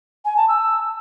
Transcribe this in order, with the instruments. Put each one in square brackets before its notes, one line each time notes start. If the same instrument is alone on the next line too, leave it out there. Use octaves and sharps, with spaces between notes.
[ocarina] G#5
A5
E6